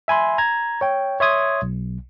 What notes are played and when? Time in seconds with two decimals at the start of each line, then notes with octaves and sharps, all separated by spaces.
0.08 E5 G#5 B5 C6
0.38 A#5 G#6
0.81 C#5 G5
1.20 C#5 E5 C6 D#6 G#6
1.62 B1